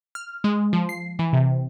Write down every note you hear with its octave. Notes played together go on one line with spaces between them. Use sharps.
F6
G#3
F3
C7
E3
C3